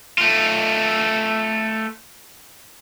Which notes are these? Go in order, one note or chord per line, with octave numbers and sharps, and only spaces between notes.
A3 F4